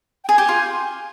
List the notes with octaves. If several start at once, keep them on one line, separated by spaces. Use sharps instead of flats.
G5
G#4 G#5
G4
F4